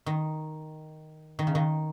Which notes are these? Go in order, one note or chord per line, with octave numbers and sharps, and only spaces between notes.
D#3
D#3
C#3
D#3